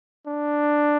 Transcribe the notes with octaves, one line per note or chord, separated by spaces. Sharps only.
D4